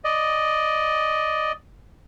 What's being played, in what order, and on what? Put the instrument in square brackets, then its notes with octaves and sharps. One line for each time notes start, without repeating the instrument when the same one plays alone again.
[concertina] D5 D#5